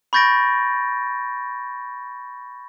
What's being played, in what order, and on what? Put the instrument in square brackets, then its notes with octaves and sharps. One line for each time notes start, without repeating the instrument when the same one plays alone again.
[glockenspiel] B5 C#6 G6 A6 A#6 D7